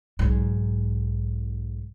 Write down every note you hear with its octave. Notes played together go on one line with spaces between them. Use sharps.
B1 G#2